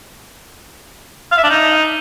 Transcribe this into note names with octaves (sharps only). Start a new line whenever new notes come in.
F5
E5
D4
D#4